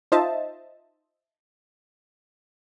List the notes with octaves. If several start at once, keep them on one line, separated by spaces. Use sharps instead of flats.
D#4 F4 C5 D#5 E5 A5